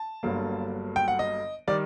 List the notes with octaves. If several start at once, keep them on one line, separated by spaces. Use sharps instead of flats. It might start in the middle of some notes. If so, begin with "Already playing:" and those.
Already playing: A5
G1 G2 D3 F#3 A#3
G5
F#5
D#5
D#3 G3 D5